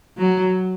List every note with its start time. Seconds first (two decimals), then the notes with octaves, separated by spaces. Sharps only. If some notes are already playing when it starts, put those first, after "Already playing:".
0.17 F#3